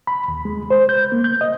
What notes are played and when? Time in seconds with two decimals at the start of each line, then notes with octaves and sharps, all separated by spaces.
0.07 B5
0.28 D#2
0.45 G#3
0.70 C5
0.89 G6
1.12 A#3
1.24 G6
1.41 D#5